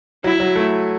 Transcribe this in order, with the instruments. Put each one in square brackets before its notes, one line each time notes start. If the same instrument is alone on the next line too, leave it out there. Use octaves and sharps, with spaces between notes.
[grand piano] F#3 [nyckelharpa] E4
[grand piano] F#3
A3